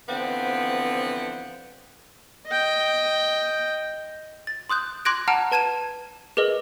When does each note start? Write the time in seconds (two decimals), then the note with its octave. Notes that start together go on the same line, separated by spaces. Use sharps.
0.08 D3 E3 F3 B3 C4
2.47 D#5 G5
4.47 A6
4.69 C6 D#6 F#6 G6
5.05 C6 D6 F#6 G#6 A#6 D7
5.28 F#5 A5 A#5 F6 D7
5.52 B4 A5 G#6 D#7 E7
6.37 G#4 A#4 B4 D#5